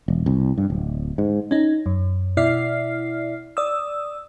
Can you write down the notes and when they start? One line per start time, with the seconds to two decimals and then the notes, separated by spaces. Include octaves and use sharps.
0.08 E1
0.26 C2
0.58 G2
0.70 D1
1.18 G#2
1.51 C#4 D#4
1.86 F#2
2.37 B2 E4 D5 E5 F6 C7
3.57 D5 D#6 E6